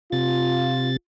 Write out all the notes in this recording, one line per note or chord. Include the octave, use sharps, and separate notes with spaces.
C3 F4 A6